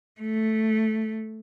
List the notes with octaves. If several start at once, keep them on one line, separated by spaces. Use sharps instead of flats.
A3